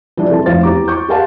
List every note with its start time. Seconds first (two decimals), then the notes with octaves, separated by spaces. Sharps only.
0.17 E3 F3 G3 D4
0.29 C3 A4 A5
0.46 F1 F2 E4 C5 F5 A6
0.63 E2 G4 A#5 D6
0.88 C#6 D6 G6
1.08 G4 G#4 A#4 F5 F#5 A5